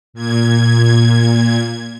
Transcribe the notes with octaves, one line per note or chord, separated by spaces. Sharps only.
A#2 G#6